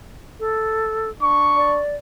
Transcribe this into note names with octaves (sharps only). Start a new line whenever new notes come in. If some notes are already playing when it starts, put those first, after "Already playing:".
A4
D4 C#6
D5